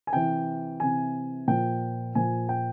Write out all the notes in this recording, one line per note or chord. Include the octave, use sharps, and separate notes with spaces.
G#5
C3 E3 G5
C3 E3 G#5
A#2 F3 G5
A#2 F3 G#5
G5